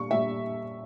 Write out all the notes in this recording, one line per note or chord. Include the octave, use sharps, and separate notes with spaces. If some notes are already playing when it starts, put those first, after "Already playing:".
Already playing: A#2 G3 C#6
A#2 G3 E5